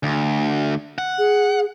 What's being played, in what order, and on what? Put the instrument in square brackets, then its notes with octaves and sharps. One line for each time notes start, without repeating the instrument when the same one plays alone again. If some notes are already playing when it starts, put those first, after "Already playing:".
[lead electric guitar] D2
F#5
[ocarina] G#4